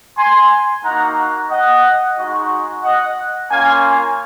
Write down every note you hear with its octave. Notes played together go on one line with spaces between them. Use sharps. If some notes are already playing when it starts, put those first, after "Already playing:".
G#5 C6
A#3 D#4 F#4 F#5 A#5
D#5 F#5
G#3 D#4 F#4
D#5 F#5
A#3 C#4 F4 F5 G#5